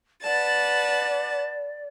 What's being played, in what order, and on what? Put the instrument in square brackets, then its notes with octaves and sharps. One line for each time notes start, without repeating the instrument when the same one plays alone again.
[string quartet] B4 F#5 A5 [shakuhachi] D5